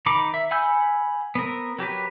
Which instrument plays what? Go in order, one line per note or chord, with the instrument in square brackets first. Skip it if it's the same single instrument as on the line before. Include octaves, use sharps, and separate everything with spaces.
[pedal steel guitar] D#3 D#4 A#5 B5 D6
E5
F#5 G#5 B5 E6 G6
B3 C4 A#4
F#3 G4 A#4 B4